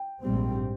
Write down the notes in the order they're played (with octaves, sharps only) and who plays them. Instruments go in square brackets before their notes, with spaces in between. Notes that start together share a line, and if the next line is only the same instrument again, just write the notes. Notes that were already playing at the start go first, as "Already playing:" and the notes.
Already playing: [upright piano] G5
[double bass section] A#1 G#2 G3 C4